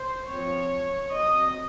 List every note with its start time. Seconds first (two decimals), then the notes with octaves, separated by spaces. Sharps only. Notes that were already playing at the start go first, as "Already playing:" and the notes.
Already playing: C5
0.29 F3 C4 C#5
1.11 F#3 C4 D#5